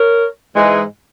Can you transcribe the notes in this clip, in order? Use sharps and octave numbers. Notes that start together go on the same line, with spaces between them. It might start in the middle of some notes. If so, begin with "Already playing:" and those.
Already playing: A#4 C#5
G#2 E3 G#3